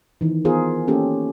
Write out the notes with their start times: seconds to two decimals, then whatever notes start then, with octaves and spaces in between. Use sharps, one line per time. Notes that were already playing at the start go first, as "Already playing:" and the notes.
0.21 D#3 E3
0.45 B3 F4 G#4 A#4 C5
0.88 A#3 C#4 G4 A4